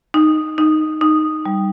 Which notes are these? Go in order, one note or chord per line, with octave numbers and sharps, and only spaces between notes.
D#4
D#4
D#4
G3